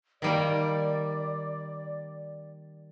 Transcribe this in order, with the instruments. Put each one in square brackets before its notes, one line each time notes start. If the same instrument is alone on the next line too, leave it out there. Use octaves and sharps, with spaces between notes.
[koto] D#3 G3 A#3 [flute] D5